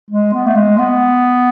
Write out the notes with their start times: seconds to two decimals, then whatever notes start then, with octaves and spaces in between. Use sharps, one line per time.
0.11 G#3
0.33 B3
0.46 A3
0.55 G#3
0.78 B3